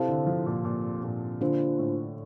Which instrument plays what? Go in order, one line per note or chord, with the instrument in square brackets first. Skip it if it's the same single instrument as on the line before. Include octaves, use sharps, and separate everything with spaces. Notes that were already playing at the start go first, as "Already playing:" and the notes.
Already playing: [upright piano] C3 [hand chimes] E4 A4 C5 F5 A5
[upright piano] D3
F3
A#2
A#2
A#2
[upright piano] D3 [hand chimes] A#3 D4 F4 C5
[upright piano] A2